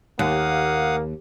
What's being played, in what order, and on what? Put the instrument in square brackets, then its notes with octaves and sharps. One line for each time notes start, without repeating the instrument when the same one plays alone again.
[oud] D#2 [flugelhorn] A#3 [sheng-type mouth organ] F5 F#5 D#6